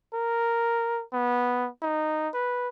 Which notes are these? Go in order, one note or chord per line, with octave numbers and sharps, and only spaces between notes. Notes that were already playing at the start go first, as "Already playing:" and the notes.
A#4
B3
D#4
B4